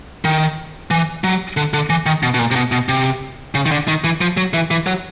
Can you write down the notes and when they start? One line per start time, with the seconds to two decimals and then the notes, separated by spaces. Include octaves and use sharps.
0.25 D#3
0.91 E3
1.24 F#3
1.57 D3
1.74 D3
1.90 E3
2.06 D#3
2.23 B2
2.34 B2
2.39 A#2
2.51 C3
2.56 B2
2.72 B2
2.89 C3
3.55 C#3
3.66 D#3
3.71 D3
3.88 D#3
4.04 E3
4.21 F3
4.37 F#3
4.54 E3
4.71 E3
4.87 F#3